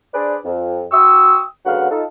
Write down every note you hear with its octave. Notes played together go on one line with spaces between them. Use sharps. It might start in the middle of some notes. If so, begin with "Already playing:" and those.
D4 G#4 B4 C5 D5
F2
F#4 G5 C6 C#6 D#6 E6
D2 C#3 F#3 B4 F5 F#5
D#4 F4 A4